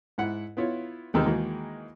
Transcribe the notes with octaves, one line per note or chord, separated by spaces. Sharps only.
G#2 E4 F#5
B3 E4 F4 C#5
D#2 C3 D#3 G#3 E6 F6
D#3 E3 G#3 A#3 F#4 G#4